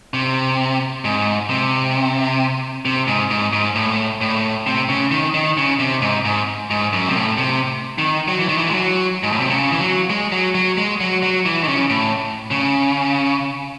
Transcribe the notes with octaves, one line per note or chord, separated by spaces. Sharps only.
C3
G#2
C3
C3
G#2
G#2
G#2
A2
A2
C3
C#3
D#3
D#3
C#3
C3
G#2
G#2
G#2
F#2
C3
A2
C3
D#3
F#3
E3
D#3
E3
G#3
F#3
G#2
A2
C3
C#3
E3
F#3
G#3
F#3
F#3
G#3
F#3
F#3
E3
D#3
C#3
A2
C#3